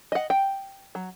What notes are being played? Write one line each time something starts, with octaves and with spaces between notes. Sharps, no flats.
D#5 F#5
G5
F#3